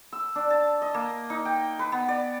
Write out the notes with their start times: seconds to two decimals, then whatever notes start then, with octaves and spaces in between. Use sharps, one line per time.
0.13 E6
0.35 D4
0.50 A5
0.82 D#5
0.94 A#3
1.30 D#4
1.45 G5
1.79 B4
1.92 B3
2.08 D5